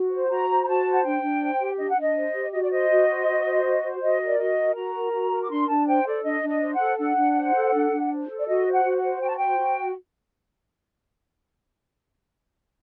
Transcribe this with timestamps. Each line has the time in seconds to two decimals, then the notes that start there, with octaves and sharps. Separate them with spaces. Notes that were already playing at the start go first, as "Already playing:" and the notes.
Already playing: F#4
0.11 C5
0.30 F#4 A#5
0.48 C5
0.63 A#5
0.67 F#4 A5
0.85 C5
0.93 F#5
1.04 D4 G5
1.23 D4
1.41 C5
1.60 G4
1.78 D4 D#5
1.89 F#5
1.96 D4 D#5
2.16 C5
2.34 G4
2.53 F#4 D#5
2.62 D5
2.71 C5 D#5
2.90 F#4
3.09 C5
3.27 F#4
3.45 C5
3.64 F#4
3.83 C5
4.01 F#4 D#5
4.20 A#4
4.26 D5
4.38 F#4 D#5
4.57 A#4
4.75 F#4 A#5
4.94 A#4
5.13 F#4
5.31 A#4
5.43 D6
5.50 D4 C6
5.69 D4 A5
5.87 C5 G5
6.06 A4 D5
6.24 D4 D#5
6.43 D4
6.49 D#5
6.62 C5
6.75 F#5
6.80 A4
6.98 D4 F#5
7.17 D4
7.36 C5
7.55 A4
7.74 D4
7.92 D4
8.10 C5
8.29 A4
8.40 D5
8.47 F#4 D#5
8.66 C5
8.72 F#5
8.85 F#4
8.97 F#5
9.03 C5
9.21 F#4 G5
9.29 A5
9.37 C5 G5
9.59 F#4